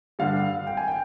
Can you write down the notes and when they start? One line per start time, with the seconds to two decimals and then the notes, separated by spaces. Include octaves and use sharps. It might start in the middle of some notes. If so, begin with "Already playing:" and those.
0.19 G2 D3 G3 F5
0.67 G#1 G5
0.77 G#5
0.88 G5